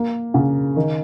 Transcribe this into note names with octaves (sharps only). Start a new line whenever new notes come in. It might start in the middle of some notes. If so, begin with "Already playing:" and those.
Already playing: A#3
C#3
D#3